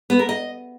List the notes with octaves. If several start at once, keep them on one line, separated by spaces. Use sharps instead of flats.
B3
A#4
D#5